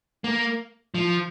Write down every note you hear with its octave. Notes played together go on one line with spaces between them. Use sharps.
A#3
F3